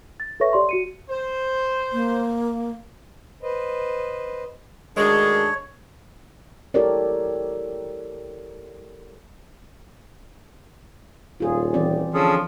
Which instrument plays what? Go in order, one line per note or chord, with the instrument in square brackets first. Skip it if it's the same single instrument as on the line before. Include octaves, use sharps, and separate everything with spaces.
[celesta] A6
A4 B4 C#5 E5 C#6 A#6
G4 D5 C6
F#4 C#7 D#7
[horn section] C5
[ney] A#3
[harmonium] B4 C5 D#5
[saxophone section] D2 D#3 G#3 [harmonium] D4 A4 [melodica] C#5
[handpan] E4 G4 A4 A#4 C#5 D5
[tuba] D#1 [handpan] F4 G#4
[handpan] E3 C4 D5
[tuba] D3 [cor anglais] F3 [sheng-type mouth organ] C#4 G#4 A4